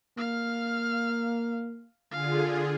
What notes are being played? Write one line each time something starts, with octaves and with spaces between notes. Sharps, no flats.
A#3 F5 F6
D3 F4 G#4 F5